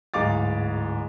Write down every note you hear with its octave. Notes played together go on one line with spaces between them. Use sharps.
D1 G#2 D#4 F5 D6 A6